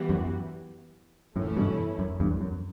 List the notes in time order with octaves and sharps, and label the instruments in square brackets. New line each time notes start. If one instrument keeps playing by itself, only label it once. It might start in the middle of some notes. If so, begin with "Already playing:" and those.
Already playing: [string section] E3 G3 B3 F#4
[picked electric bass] F#2
[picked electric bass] F#2 A2 [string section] E3 A3 C#4 E4
[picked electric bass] G2 B2
F#2
E2 G2
F#2